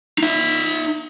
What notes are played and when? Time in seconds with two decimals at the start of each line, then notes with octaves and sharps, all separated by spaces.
0.18 D#4 E5